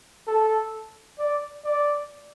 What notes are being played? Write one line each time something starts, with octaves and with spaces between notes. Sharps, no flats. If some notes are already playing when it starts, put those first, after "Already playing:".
A4
D5
D5